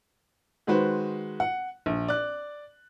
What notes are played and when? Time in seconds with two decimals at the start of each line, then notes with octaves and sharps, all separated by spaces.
0.67 D#3 G#3 F#4 B4 C5
1.40 F#5
1.86 A#1
2.08 D5 F#6